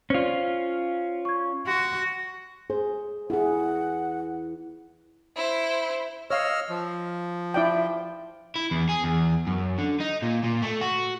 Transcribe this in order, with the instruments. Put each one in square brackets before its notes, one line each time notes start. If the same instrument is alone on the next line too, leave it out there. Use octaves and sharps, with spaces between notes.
[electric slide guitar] C#4 F4 [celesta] C5 D5
[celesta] C#6 G#6
[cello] F#4 [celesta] C6
[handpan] G#4 [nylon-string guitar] C5
[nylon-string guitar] E2 E3 B3 [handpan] E4 G#4 [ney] F#5
[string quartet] E4 C5
[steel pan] C#5 F5 [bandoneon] D#5 E6 F6
[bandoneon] F3
[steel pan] E4 D5 G5
[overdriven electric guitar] E4
E2
G#4
E2
F#2
D3
D#4
A#2
A#2
A3
F#4